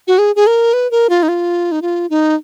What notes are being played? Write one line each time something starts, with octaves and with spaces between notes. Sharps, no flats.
F#4
G#4
G#4
A#4
B4
A#4
F4
D#4
F4
D#4
F4
D#4